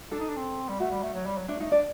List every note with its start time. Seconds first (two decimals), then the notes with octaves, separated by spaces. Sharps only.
0.11 D4 A4
0.19 D#4
0.29 D4
0.36 C4
0.69 G3
0.80 A3 F#4
0.91 G3
1.03 A3
1.14 F#3
1.26 G3
1.37 F#3
1.48 A3 D4
1.60 A3 D#4
1.72 D4 D5